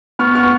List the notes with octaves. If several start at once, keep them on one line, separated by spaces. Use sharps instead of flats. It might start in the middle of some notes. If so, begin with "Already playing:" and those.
B3 C#6 F6
C#6 F6
B3